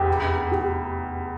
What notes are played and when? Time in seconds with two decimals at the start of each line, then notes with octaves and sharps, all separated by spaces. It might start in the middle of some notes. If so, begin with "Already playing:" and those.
Already playing: F1 E2 G4
0.52 G4